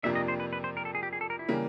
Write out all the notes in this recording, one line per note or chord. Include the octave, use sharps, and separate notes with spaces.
F2 C3 F3 A#3 D4 E5
D#5
C5
B4
B4
C5
A#4
A4
G#4
G4
G#4
A4
A#4
E4
C#3 E3 G3 A#3